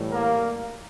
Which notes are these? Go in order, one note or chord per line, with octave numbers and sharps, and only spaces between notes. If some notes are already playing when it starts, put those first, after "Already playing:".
Already playing: A2 E3 G3
A#3 A#4